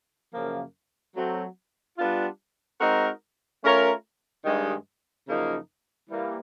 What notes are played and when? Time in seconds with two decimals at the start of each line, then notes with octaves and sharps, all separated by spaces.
0.33 F#2 C#3 F3 A#3
1.16 F#3 A3 C4
1.98 G3 B3 D4 F4
2.80 G#3 C4 D#4 F#4 A#4
3.62 A3 C#4 F4 A#4 C#5
4.45 G2 D#3 G#3
5.27 F#2 C#3 F3 A#3 D#4
6.09 E3 G3 A#3